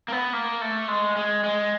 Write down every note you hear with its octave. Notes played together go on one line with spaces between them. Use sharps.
A#3
B3
A#3
A3
G#3
G#3
G#3